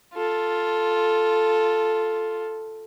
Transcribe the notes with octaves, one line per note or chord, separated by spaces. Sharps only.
F4 A4